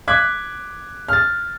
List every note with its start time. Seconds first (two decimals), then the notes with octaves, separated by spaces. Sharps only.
0.08 D6 F#6 G#6 B6
1.08 F6 A6